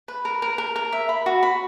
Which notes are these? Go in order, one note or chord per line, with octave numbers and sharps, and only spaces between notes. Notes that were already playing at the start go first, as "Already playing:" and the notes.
B4
A#4
A#4
A#4
A#4
E5
B5
F#4
B5